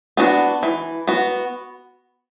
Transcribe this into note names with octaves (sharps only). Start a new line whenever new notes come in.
B3 D4 F#4
E3
B3 F#4